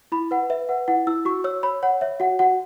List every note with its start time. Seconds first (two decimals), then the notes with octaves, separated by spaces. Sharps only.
0.12 E4 B5
0.31 B4 F#5
0.50 B4 E5
0.69 B4 F#5
0.88 E4 F#5
1.07 E4 E6
1.25 F#4 C#6
1.44 C#5 E6
1.63 C#5 B5
1.83 C#5 F#5
2.01 C#5 E5
2.20 F#4 F#5
2.39 F#4 F#5